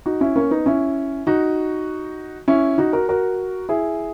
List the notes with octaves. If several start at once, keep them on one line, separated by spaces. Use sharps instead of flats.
D#4 F#4
C#4 E4
A#3 C#4
B3 D#4
C#4 E4
D#4 F#4
C#4 E4
D#4 F#4
F#4 A#4
F#4 A#4
E4 G#4